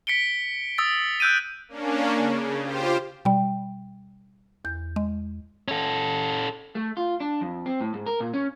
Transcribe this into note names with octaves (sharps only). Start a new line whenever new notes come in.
B6 C#7 D7 G7
D#6 E6 A6
E6 F#6 G6 D7 D#7
A#3 C#4 D4
C#3
F4 G4 C5
B2 G3 G5
E2 G6
G#3
C#4 A4
A3
F4
D4
F2
C4
A2
G#2
A#4
A#2
C#4